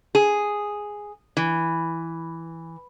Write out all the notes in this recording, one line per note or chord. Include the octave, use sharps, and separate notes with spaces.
G#4
E3